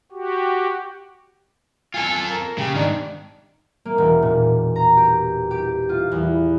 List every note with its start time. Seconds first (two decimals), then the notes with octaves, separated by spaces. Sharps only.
0.12 F#4 G4
1.94 F4 A4 G#5
2.30 A#4
2.58 C#3 G4
2.75 G#2 D#3 D4
3.85 A#3
3.98 E1
4.22 A#2
4.76 A#5
4.97 G4
5.51 G4
5.89 F4
6.12 E2